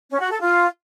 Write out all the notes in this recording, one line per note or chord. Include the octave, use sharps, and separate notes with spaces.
C#4
F#4
A4
F4